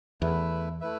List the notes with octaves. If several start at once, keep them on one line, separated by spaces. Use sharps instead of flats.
E2 A3 E4 B4 E5
A3 E4 B4 E5